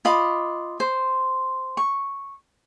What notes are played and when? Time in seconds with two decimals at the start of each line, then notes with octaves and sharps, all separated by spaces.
0.05 F4 D#5 B5 D6
0.80 C5
1.77 C#6